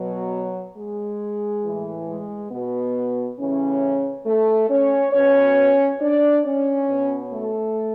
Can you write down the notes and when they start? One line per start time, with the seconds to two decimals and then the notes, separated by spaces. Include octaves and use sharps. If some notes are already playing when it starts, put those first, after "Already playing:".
Already playing: B2 F#3
0.76 G#3
1.64 A2 E3
2.08 G#3
2.51 B2 B3
3.38 A2 C#3 E3 C#4
4.26 A3 A4
4.69 C#4 C#5
5.13 B2 C#4 C#5
6.01 D4 D5
6.45 C#4 C#5
6.88 B2
7.32 A3 A4